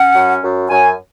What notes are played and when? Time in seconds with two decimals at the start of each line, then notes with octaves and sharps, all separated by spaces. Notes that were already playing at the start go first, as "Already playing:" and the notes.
Already playing: C#4 F#5
0.15 F#2
0.43 F#2
0.70 F#2 G#5